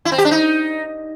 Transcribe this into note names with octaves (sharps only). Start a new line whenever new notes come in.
E4
C4
G4
D4
D#4